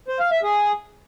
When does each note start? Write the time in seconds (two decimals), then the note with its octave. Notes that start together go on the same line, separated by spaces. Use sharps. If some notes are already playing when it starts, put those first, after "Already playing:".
0.08 C5
0.20 F5
0.31 E5
0.43 G#4